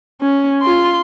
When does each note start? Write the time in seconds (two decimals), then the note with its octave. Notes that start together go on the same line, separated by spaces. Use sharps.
0.21 C#4
0.62 F4 C6